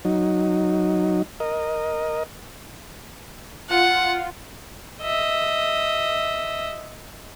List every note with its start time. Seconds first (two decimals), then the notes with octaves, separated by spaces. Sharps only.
0.05 F#3 D#4
1.40 A#4 D#5
3.69 F4 F#5
5.01 D#5 E5